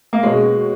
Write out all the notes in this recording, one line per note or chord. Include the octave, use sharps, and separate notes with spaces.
A#3
B2 G#3 A#3 C#4